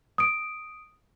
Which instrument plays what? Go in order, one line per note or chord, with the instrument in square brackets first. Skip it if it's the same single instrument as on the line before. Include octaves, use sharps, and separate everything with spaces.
[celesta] D#6 D7